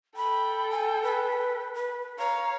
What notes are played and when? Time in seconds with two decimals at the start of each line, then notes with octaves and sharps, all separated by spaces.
0.17 A4 G5 B5
0.71 G#5
1.03 B4
1.74 B4
2.19 C#5 F5 A#5